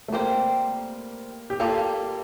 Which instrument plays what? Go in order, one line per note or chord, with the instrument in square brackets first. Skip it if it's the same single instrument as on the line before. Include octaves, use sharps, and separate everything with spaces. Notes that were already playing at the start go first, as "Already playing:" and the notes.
[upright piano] A3
[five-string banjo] G3 C4 G4 C5 [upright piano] A#3
[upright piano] G4
[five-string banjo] G3 A#3 F4 [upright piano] A4